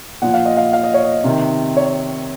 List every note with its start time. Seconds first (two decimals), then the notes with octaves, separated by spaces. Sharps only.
0.22 A#2 F3 F#5
0.34 F5
0.45 D#5
0.57 F5
0.73 F5
0.84 D#5
0.94 C#5
1.05 D#5
1.24 C3 D#3
1.77 C#5